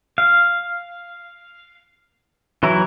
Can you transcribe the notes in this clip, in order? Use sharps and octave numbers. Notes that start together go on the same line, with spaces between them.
F5
E3 F#3 E4 A#5